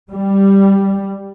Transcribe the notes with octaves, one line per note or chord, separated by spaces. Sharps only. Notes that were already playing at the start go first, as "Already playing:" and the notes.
G3